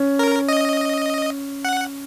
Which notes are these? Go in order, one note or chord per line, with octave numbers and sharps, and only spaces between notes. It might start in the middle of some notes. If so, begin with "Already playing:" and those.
Already playing: C#4
A#4
D#5
F#5